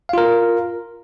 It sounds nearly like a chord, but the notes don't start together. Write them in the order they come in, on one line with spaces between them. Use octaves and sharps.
F5 F4 A#4